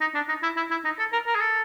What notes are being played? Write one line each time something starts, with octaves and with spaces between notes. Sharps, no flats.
D#4
D4
D#4
E4
E4
E4
D#4
A4
A#4
A#4
G#4
A4